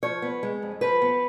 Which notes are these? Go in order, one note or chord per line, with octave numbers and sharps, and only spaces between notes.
F3 C#5
B3
G#3
F2
F3 B4
B3